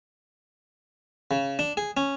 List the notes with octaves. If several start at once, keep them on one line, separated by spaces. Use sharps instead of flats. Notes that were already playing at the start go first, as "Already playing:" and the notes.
C#3
D4
G#4
C#4